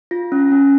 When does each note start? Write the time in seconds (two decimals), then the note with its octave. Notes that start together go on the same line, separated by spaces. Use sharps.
0.11 F4 A#6
0.32 C#4
0.52 C#4